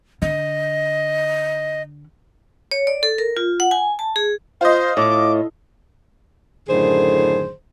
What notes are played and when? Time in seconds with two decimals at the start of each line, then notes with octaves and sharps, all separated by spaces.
0.22 D3 D#5
2.71 C#5
2.87 D5
3.03 A4
3.18 A#4
3.37 F4
3.60 F#5
3.71 G#5
3.99 A5
4.16 G#4
4.61 F4 C5 D#5
4.97 A2 D6
6.69 F#2 A2 D3 D#3 G#4 C5